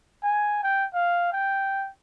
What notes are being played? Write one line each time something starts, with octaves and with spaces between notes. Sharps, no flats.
G#5
G5
F5
G5